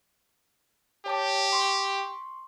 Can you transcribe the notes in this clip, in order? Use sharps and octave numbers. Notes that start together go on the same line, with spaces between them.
G4 C#5 A5 D6
C6 C#6